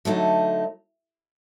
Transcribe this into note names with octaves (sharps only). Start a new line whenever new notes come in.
D3 F#3 A3 C4 D#4